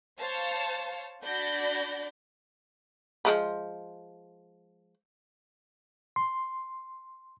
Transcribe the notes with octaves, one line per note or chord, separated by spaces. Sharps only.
C5 C#5 F5 A5
D4 F#4 D5 B5 G6 A#6
F3 G#3 B3
C6